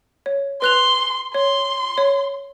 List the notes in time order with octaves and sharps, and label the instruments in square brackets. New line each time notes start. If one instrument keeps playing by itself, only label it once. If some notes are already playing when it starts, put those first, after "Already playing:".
[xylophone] C#5
[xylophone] B4 F#6 F7 [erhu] C6
[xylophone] C#5 [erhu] C6
[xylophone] C#5